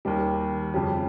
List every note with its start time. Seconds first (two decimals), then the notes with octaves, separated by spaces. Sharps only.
0.05 D#2 D#3 G3
0.74 F2 C#3 G3 C#4 G4